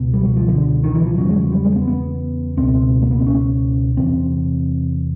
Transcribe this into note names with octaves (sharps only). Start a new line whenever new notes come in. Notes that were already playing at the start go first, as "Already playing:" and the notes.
Already playing: C#2 B2
G3
F#3
F3
D3
D#3
E3
F3
E2 C#3 F#3
G#3
F#3
G3
G#3
B3
B3
C#2 B2 C4
A#3
B3
C4
C#4
E2 C3 C4